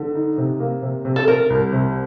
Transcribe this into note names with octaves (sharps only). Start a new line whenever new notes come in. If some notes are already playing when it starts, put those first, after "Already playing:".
Already playing: D3
D#4
C3
A#3
C3
C3
A4
C3 A#4
C2
C3